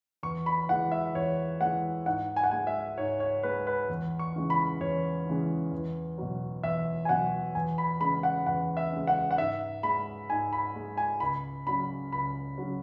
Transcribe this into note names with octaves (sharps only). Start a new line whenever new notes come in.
E2 C#6
B5
E3 G#3 F#5
E5
E2 C#5
E3 G#3 F#5
G#2 F#5
G#5
F#5
G#3 G#5
E5
G#2 C#5
C#5
G#3 B4
B4
E2
C#6
C#3 E3 G#3
B5
E2 C#5
C#3 E3 G#3
E2
B2 F#3
E2 E5
G#5
B2 F#3 F#5
E2 G#5
B5
C#3 G#3 B5
F#5
E2 F#5
E5
C#3 G#3
F#5
F#5
G#2 E5
G#3 B5
G#2 G#5
B5
G#3
G#5
C#2 B5
C#3 F#3 B5
C#2 B5
C#3 F#3